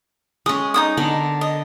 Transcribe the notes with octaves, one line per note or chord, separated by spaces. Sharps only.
G#3 C#4 D#6
D#4 E4 D#6
D3 B3 A#4
D#5